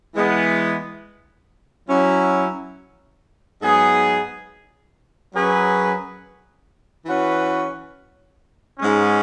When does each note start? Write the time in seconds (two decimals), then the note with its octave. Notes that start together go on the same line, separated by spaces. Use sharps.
0.15 E3 G#3 B3
1.88 F#3 C#4 E4
3.61 G#2 F#3 B3 G#4
5.34 F#2 F#3 C#4 G#4 B4
7.06 E3 C#4 F#4 B4
8.79 G#2 G#3 C#4